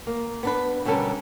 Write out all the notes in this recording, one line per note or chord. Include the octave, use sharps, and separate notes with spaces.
A#3
B3 D4 B4
B2 D3 G3 C#4 A4 A#4